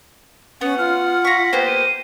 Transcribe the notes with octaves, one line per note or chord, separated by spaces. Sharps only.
B3 C#4 F#5
F4 F6
A#5 C#6 B6
A#3 B3 G4 C5
D#7